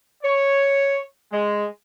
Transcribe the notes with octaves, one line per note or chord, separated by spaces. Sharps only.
C#5
G#3